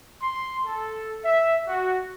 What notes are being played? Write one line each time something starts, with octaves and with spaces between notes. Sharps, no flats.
C6
A4
E5
F#4